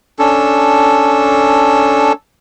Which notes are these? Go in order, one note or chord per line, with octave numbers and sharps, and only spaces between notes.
C#4 D4 A4